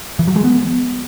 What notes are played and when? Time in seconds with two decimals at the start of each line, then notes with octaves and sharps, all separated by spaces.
0.19 E3
0.28 F#3
0.36 G#3
0.44 B3